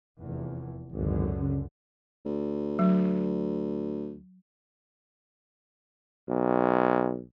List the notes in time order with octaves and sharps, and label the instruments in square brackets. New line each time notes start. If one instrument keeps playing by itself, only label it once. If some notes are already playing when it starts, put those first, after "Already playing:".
[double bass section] F1 E2
[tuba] G#1 [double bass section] C#2 F#2 D3
[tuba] C#3
[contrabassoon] D2
[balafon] F#3
[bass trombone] B1